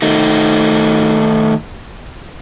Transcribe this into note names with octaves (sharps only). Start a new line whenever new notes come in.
D#3 A3 D#4